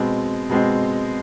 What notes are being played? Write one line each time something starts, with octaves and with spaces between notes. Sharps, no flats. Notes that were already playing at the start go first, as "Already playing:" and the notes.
Already playing: B2 G#3 C4
B2 G#3 C4